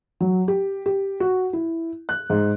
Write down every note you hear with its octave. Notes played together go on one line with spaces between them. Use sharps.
F#3
G4
G4
F#4
E4
F#6
G#2